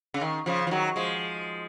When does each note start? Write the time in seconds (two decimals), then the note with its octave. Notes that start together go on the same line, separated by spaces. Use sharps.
0.14 C#3
0.21 D#3
0.46 C#3 F3
0.67 F3
0.71 D#3 F#3
0.96 F3 G#3